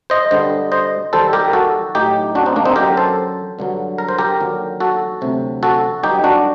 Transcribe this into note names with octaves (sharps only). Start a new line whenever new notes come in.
C5 D#5
G2 D3 G3 C5 D#5
C5 D#5
D#2 D#3 G3 A4 C5
G4 A#4
F#4 A4
A2 F#3 D#4 G4
D4 F#4
C4 D#4
A#3 D4
C4 D#4
F#2 D3 F#3 G4 A#4
A4 C5
G2 D3 F#3
A#4
C5
G4 A#4
D#2 D3 F#3
F#4 A4
D2 C3 F#3
F#4 A4
G2 D3 F#3 D#4 G4
D4 F#4